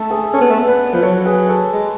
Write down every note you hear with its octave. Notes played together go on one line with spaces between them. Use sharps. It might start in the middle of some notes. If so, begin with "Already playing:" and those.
Already playing: A3 A4
G#4
C#4 A4
B3
A3
B3
B4 D5
F3 B4
F#3 A4 C#5
G#4 B4
A4 C#5
G#3